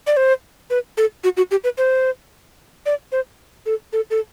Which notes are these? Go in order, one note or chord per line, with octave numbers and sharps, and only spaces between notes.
D5
C5
B4
A4
F#4
F#4
G4
B4
C5
D5
C5
A4
A4
A4